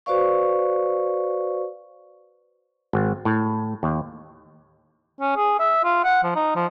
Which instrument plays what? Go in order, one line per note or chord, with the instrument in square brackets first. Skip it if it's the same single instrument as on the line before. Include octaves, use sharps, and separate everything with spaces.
[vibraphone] F#4 B4 C5 D5 F5 C#6
[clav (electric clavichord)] G#1
A2
D#2
[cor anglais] C#4
G#4
E5
F4
F#5
F3
D#4
F3